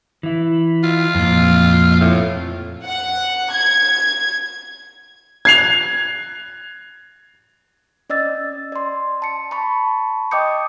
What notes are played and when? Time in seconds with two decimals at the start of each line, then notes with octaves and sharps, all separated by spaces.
0.23 E3 E4
0.83 F4
1.15 F2 A#2
2.00 A2
2.84 F#5
3.52 G#6
5.45 G#6 C7 F7
8.10 C#4 D5 D#5 E6 A6
8.72 D5 C6
9.22 A5 C#7
9.51 A5 B5 C#6
10.31 D#5 G5 D6 D#6 G6 C#7